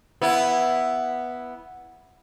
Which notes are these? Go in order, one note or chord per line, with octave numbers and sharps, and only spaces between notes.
B3 E4